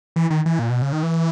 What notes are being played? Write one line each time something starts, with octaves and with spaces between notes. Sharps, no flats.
E3
D#3
E3
A#2
B2
C#3
D#3
E3